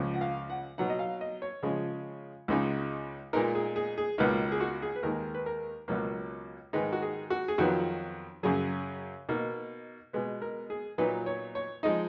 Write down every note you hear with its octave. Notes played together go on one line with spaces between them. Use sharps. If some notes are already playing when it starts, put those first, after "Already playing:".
Already playing: C#2 C#3 F3
F#5
F5
F#5
B2 F#3 B3 D#4 F#5
D#5
F5
D#5
C#5
C#3 F3 G#3
C#2 C#3 G#3 D#4
A#2 G#3 B3 D#4 A#4
G#4
G#4
G#4
C#2 B2 A#3 D#4 B4
G#4
F#4
G#4
B4
D#2 D#3 G#3 A#4
B4
A#4
C#2 B2 F#3 A#3
G#2 D#3 G#3 D#4 B4
F#4
G#4
F#4
G#4
F2 D#3 F#3 B3 F#4
F#2 C#3 F#3 G#4
B2 A#3 D#4
B2 G#3 B3
A#4
G#4
A#2 F#3 B3 D#4 B4
C#5
C#5
F3 G#3 D#4 D#5